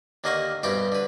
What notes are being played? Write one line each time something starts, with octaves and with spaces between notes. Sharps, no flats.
D#2 D3 A#3 D#5 F#5 C#6
C2 G2 B2 G4 G5 B5
D3 B4